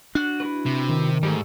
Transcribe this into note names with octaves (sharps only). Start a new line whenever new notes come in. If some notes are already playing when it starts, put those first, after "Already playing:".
D4 F#4 F#6
E4 F#4 B4
C3
D#3
G#2 G3 A3